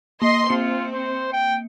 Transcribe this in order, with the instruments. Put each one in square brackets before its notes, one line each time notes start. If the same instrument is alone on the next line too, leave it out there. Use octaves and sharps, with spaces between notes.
[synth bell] A#3 [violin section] D#5 C6
[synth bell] A#3 C#7 [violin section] C4 [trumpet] F4
[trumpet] C5
G5